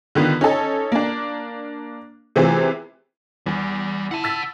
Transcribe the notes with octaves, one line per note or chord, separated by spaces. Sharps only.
D3 D#3 B3 F4
C#4 D#4 A4
A#3 D4
C3 E3 A3 C4 F4 G#4
E2 G3
E4 F#5 A5
E6 A6 B6